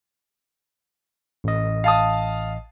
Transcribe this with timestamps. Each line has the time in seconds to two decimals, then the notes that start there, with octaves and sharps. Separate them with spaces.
1.44 A1 D#5
1.84 F5 A5 D#6